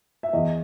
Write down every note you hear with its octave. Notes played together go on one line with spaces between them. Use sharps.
E5
E2 D#5